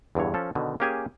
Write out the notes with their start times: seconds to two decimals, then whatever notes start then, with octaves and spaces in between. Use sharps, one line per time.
0.15 E2 G2 D3 C#5
0.34 F3 C#4 A4
0.55 B2 D3 D#3
0.80 A#3 C#4 G4 G#4 G#5